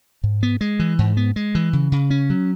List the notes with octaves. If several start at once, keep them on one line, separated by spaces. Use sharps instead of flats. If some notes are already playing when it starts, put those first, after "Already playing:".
G#2
B3
G#3
E3
G#2
B3
G#3
E3
C#3
C#3
C#4
F#3